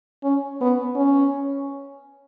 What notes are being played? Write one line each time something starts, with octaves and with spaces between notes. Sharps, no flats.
C#4
B3
C#4